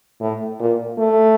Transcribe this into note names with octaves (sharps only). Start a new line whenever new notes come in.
A2
A#2
A3